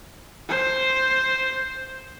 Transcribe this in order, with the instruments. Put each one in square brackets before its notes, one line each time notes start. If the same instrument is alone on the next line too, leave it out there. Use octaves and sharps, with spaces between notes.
[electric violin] C5